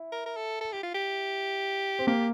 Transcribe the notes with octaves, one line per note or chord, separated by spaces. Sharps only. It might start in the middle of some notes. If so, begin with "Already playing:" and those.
Already playing: E4
A#4
A#4
A4
A4
G4
F4
G4
C4
A#3 G4